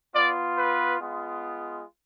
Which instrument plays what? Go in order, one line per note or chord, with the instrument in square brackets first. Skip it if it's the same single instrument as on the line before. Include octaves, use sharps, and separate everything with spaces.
[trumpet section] B3 F4 D5
B4
G#3 B3 F4